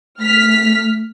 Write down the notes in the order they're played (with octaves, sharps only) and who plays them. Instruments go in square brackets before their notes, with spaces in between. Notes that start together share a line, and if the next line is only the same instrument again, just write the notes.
[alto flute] A3 [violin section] F6 B6